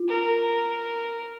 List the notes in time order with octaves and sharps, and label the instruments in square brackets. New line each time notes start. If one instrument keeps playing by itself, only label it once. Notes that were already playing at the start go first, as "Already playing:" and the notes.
Already playing: [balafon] F4
[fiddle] A#4